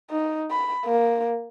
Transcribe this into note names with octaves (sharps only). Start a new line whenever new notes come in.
D#4
B5
A#3